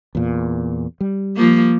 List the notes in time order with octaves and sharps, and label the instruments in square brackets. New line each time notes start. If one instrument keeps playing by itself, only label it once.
[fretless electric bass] E2 A#2
G3
[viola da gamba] F3 A#3